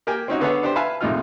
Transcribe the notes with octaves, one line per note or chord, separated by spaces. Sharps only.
A#3 G4 A#4 G5 G#5
C4 C#4 D#4 F#4
D3 B3 G#4 A4 B4 C#5
D4 G4 C5
B4 E5 F5 G#5 A5
A#1 A2 C3 D#4 F4 F6